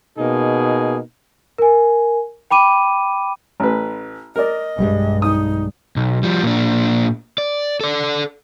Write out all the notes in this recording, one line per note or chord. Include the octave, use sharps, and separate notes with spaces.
B2 A#3 D#4 G#4
A#4 G#5
G5 B5 D6 D#7
A1 B4
A#4 D5 D#5
B1 G2 G3 G#3
D#4 D#6
B1
F3 G3
A#2 D4
D5
A4 D5